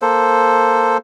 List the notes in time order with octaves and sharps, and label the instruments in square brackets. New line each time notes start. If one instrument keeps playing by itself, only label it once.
[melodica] A#3 A4 C5